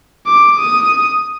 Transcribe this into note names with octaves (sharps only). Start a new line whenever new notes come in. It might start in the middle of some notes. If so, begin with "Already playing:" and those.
D6
D#6